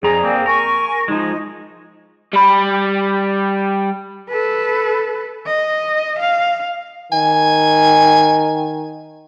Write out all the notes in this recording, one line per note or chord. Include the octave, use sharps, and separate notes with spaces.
F2 G#4 D5 A#5
A#3 C4
A#4 G#5 C#6
F3 G#3 D#4
G3 B5
A4 B4
D#5
F5
D#3 G#5